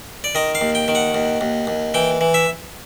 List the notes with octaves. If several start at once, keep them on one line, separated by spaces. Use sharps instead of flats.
D5
D#3 D#5
F5
D#2
G5
D#3
F#5
D#2
D#2
D#2
E3 G5
E3
E5